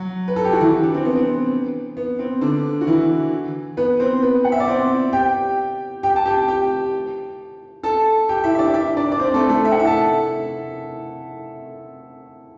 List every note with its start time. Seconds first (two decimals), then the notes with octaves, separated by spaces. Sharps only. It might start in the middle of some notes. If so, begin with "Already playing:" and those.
Already playing: F#3 F#4
0.28 B4
0.36 A4
0.45 G4
0.53 F#4
0.61 E3 E4
0.83 D4
0.94 C4
1.05 B3
1.16 C4
1.97 B3
2.19 C4
2.41 D3 D4
2.81 F#4
2.87 E3 E4
3.77 B3 B4
4.00 C4 C5
4.22 B3 B4
4.44 F#5
4.52 E5
4.60 D5
4.68 C4 C5
5.13 G4 G5
6.03 G4 G5
6.16 A5
6.26 G4 G5
6.48 G4 G5
7.83 A4 A5
8.29 G4 G5
8.44 E4 E5
8.55 E5
8.59 D4 D5
8.74 E4 E5
8.97 D4 D5
9.12 D5
9.19 C4 C5
9.34 A3 A4
9.49 A3 A4
9.65 E5
9.72 F#5
9.79 E4 E5
9.87 A4 A5